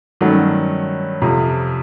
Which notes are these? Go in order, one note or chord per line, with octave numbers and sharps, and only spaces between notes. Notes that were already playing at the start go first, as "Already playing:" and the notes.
G2 D#3 F#3 A3 C#4
F2 C3 F3